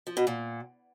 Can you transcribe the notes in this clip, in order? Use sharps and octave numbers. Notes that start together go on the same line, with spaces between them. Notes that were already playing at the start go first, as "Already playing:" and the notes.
F3
B2
A#2